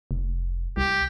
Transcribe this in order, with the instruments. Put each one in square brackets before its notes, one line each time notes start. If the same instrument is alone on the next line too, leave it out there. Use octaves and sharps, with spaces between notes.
[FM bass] F1
[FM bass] C2 [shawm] G4